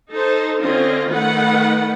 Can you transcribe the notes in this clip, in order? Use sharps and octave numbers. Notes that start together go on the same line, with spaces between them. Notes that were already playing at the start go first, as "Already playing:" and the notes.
D#4 A4 C5
D3 C4 C#4 F4 D#5
D#3 A3 B4 F#5